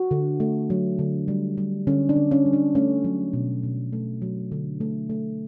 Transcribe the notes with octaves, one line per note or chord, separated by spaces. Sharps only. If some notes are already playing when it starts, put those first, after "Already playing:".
Already playing: F#4
D3
A3
F#3
D3
G3
G3
D3 C#4
D4
D3
C#4
G3
D4
A3 C#4
F#3
B2
B2
A3
F#3
D3
A3
A3